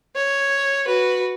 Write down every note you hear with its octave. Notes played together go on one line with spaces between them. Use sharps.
C#5
F#4 B4